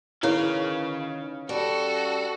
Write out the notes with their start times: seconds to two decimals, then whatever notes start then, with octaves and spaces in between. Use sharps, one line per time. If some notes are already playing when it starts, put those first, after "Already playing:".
0.23 D#3 C#4 E4 G#4 B4 C#5 F5
1.49 G3 F#4 A4